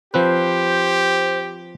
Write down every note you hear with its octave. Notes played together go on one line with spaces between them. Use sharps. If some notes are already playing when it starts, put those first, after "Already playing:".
F3 C4 G4 B4 C5